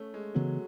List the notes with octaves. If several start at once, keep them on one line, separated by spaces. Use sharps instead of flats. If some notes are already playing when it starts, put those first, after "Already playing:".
Already playing: A3 C#4
G#3
C#3 E3 F#3 G#3 B3